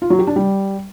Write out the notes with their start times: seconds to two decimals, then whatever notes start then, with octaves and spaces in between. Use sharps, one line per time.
0.02 F4
0.10 F#3
0.19 G4
0.27 D4
0.36 G3